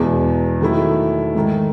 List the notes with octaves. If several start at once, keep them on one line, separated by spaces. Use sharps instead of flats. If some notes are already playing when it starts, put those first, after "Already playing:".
Already playing: E2 B2 G#3
D#3 F#3 A3 E4
G#2 D#3 A3